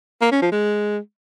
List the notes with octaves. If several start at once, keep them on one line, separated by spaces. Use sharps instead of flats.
A#3
C#4
F3
G#3